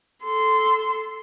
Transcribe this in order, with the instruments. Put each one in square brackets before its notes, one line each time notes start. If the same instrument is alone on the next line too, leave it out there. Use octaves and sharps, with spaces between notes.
[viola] A4 C6